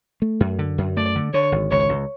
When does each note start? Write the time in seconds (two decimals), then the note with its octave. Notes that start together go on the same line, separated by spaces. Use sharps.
0.22 A3
0.40 F#2
0.59 D3
0.78 F#2
0.97 A3 D5
1.16 D3
1.33 D3 C#5
1.52 G#1
1.71 C#2 C#5
1.89 C#2